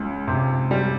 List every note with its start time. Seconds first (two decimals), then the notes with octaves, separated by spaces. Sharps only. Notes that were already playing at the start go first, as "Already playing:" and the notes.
Already playing: C#2 C#4
0.28 C3
0.71 G3